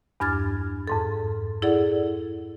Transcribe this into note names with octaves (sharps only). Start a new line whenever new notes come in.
E2 G2 D4 F6 G#6 A6
F2 G#2 A4
E4 G#4 A4 D5 F#5